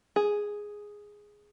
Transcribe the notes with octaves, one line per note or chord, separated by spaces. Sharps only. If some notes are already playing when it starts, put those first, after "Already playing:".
G#4